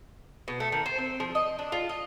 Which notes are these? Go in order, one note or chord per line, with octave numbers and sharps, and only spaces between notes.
B2
A3
D#3
C5
C4
F3
D#5
D4
F4
D#5